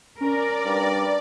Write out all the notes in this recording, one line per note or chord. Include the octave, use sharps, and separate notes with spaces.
C#4 A#4 D5
G2